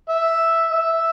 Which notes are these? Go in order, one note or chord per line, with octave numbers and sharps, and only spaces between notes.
E5
E5